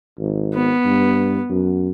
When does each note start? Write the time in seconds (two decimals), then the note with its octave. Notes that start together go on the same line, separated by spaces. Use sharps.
0.19 G#1
0.54 B3
0.85 G2
1.50 F#2